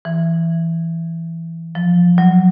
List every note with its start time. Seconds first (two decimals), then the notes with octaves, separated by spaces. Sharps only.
0.05 E3
1.75 F3
2.18 F#3